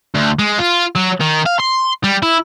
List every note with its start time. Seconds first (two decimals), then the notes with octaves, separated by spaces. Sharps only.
0.15 D2
0.39 G#3
0.59 F4
0.96 F#3
1.21 D#3
1.46 F5
1.59 C6
2.04 G3
2.23 E4